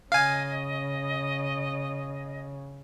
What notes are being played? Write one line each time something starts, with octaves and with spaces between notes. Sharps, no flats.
C#3 D#5 F5 G#5